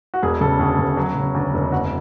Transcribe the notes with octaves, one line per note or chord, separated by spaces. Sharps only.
F#4
E1 G#4
C#3 A4
D2 G#4
E1
F#3
C#3
D2
E1
F#1 F#4